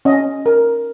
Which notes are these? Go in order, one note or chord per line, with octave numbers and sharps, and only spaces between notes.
C#4 D#5
A#4